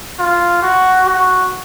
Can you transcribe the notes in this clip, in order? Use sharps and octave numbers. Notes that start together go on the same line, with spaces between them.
F4
F#4
F#4